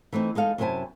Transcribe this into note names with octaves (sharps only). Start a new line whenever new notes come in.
E3 A3 C4 D#4
G#3 D#4 A4 F5
F#2 C3 E4 C5 G#5 A5